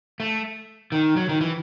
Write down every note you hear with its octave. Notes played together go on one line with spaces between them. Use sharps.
A3
D#3
F#3
D#3
E3